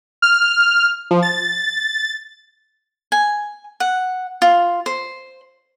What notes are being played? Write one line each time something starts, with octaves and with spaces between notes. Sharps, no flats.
F6
F3
A6
G#5
F#5
F4
C5